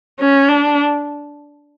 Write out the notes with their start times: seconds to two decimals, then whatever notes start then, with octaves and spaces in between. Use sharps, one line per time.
0.20 C#4
0.49 D4